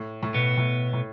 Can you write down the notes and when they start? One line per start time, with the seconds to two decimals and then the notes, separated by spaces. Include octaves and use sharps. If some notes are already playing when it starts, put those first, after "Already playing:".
Already playing: A2
0.23 A2
0.34 B2 B3
0.58 A2
0.93 A2